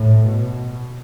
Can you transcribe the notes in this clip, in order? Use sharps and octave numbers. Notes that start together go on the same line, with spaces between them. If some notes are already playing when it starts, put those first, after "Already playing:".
Already playing: A2
B2